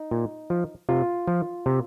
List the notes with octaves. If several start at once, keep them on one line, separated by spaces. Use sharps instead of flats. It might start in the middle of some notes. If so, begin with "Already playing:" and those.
Already playing: D#4
A#2
F3
C3 F4
F3
C3